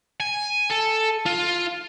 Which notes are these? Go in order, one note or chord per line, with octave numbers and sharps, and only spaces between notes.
G#5
A4
F4